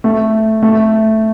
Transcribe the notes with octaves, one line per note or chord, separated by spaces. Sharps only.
A3
A3